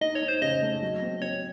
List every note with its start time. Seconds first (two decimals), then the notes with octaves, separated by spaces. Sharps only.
0.01 D#4 D#5
0.15 C#5
0.22 D#4
0.28 C5
0.42 C#3 D#5
0.62 A3
0.82 F#3
1.02 C4
1.21 C4 C#5